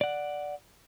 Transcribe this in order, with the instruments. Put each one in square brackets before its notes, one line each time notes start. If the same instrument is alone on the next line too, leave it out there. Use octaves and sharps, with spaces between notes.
[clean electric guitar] D5 F#5